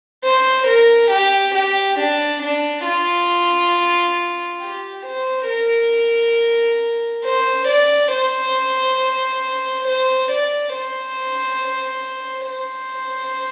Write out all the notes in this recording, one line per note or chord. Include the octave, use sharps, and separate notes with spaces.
C5
A#4
G4
G4
D4
D4
F4
G4
C5
A#4
C5
D5
C5
C5
D5
C5
C5